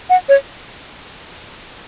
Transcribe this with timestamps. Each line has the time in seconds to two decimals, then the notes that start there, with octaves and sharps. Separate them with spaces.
0.10 F#5
0.29 C#5